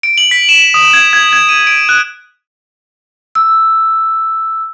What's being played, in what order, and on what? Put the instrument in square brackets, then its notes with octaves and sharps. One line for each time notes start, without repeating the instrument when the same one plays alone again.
[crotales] D7
F#7
B6
E7
D#6
G#6
G#6
G#6
D#7
D7
F#6
[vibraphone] E6